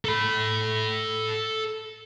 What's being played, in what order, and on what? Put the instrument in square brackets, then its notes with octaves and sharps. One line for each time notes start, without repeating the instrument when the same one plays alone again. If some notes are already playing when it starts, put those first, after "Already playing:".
[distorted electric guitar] A4 B5